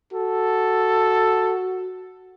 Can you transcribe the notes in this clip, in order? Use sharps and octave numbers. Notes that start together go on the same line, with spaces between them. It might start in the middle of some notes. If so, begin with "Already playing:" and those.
F#4 A4